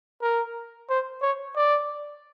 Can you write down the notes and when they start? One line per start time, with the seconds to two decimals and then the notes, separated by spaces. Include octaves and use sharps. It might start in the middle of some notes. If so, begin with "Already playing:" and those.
0.22 A#4
0.90 C5
1.22 C#5
1.56 D5